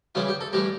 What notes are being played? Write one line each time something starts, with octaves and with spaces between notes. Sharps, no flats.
C#3 E3 G3 F4
G4
A4
A2 E3 G3 G4